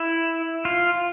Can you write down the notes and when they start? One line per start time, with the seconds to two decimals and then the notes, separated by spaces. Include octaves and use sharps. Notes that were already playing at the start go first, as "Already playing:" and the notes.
Already playing: E4
0.65 F4